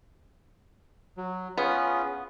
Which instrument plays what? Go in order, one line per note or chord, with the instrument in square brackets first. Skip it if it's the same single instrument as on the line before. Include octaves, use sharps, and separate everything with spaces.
[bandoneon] F#3
[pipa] B3 [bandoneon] C#4 F4 G#4